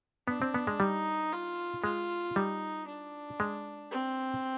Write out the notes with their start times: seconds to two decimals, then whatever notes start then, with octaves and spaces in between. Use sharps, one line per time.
0.28 B3 D4
0.42 C4
0.54 B3
0.67 G#3
0.80 G3 D#4
1.32 F4
1.84 G#3 F4
2.36 G3 D#4
2.87 D4
3.40 G#3
3.91 C4